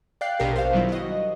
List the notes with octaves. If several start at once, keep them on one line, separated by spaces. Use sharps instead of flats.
D5 F5 G5 F#6 C7
A#1 B2 D4 G4 A#4
C5 F5
B2 D#3 F#3 G3 E4 F4
F#4 D#5